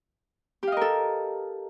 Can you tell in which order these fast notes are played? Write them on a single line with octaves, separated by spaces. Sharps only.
G4 F5 D#5 A#4 A4